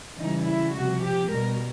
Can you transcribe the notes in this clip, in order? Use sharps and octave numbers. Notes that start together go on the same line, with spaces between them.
C#3 E3 G3 D#4
E4
C3 F3 F#4
G4
B2 G3 A#4